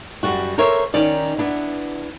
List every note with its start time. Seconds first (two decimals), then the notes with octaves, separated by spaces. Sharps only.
0.23 F#2 G3 F#4
0.58 A4 A#4 C5 C#5 E5
0.94 D#3 C#4 D#4 D5
1.38 B3 D4 E4